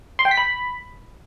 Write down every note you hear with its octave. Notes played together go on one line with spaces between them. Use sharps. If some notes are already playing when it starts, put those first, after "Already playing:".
C6
G5
B6
B5